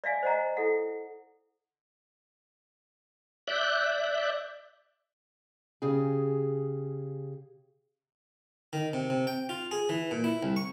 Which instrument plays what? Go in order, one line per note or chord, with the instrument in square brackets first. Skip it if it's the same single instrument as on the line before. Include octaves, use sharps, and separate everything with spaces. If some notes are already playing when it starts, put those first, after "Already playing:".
[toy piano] D5 E5 F5 G#5
C5 D#5 F#5 A#5
E4 A4 F#5
[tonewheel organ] D5 E5 F#6 G6
[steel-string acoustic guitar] C#3 G4 G#4
[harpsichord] D#3
C3
C3
G5
F4
G#4
E3
A#2
E4
C2
C#6